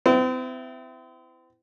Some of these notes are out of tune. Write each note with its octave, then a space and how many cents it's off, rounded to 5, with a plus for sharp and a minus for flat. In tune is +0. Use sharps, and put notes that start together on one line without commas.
C4 -40 E4 +15